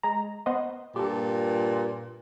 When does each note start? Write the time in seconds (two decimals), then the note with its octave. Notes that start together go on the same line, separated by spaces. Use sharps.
0.03 G#3 A#5
0.46 B3 C5 D#5
0.96 G2 A#2 G4 A4